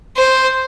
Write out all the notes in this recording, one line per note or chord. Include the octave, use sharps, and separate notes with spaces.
C5